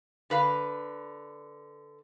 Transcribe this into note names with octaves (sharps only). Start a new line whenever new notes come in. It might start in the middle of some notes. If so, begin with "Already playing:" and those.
D3 B4 F5